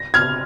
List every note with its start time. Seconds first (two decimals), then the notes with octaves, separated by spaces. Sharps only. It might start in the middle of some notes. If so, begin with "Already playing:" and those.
Already playing: A#6
0.14 F6 G#6